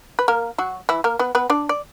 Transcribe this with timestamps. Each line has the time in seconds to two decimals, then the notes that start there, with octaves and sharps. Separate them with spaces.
0.19 B4
0.28 A#3 A#4
0.58 F#3 F#4
0.89 E3 E4
1.04 A#3 A#4
1.19 B3 B4
1.35 B3 B4
1.50 D4 D5
1.69 D5